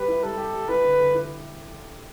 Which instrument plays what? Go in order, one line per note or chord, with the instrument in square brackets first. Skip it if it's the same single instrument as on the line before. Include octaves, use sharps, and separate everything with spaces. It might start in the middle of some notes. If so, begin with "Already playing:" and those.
Already playing: [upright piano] G3 G4 [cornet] B4
[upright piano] E4
[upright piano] G3 [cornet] A4
[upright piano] G4
G3
[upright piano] E4 [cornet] B4
[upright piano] D3
D3
E4